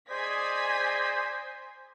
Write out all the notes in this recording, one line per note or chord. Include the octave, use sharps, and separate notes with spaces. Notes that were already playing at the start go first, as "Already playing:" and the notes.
G#4 C5 D5 D#5 G#5 G#6 B6